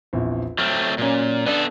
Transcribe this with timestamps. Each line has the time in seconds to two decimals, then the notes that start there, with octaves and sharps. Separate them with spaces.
0.13 A#1 E2 C4
0.59 F#3 A3 C4 F6
0.98 A#2 F#3 C#4
1.46 B3 D4 A4 D5